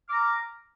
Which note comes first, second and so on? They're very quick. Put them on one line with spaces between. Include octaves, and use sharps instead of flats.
F6 D6 A#5